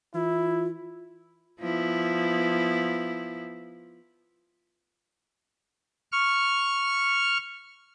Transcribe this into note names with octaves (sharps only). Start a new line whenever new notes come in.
E3 E4 F4
F3 B3 E4
C#6 F6